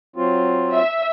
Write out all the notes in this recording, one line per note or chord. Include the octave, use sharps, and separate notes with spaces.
F#3 C4 F4
E5